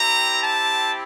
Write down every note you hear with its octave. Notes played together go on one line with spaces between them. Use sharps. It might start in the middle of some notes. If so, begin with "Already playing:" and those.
Already playing: C4 E4 G4 A#5
A5